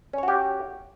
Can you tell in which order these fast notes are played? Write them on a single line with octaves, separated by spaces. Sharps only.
C#4 C#5 F#4 G4